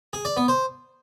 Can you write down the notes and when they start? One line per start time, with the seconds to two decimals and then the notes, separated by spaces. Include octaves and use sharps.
0.13 G#4
0.25 D5
0.37 B3
0.48 C5